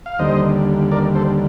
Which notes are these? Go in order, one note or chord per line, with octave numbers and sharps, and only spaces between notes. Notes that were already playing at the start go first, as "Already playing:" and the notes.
F5
D#2 D3 G3 C5 D#5
A#4 D5
A4 C5